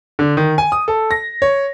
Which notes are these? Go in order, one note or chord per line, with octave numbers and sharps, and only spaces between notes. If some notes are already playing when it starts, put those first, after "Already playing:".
D3
D#3
G#5
D#6
A4
A#6
C#5